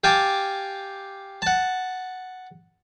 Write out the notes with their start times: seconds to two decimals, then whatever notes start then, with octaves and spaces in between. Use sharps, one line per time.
0.04 G4 F5 G#5 A5 D6
1.42 F#5 A5